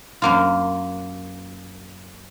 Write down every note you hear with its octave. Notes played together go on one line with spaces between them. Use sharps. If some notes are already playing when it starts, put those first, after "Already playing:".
F#2 A#3 F4